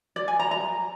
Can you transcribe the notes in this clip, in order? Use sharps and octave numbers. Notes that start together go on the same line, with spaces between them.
D5
G#5
A#5
A#5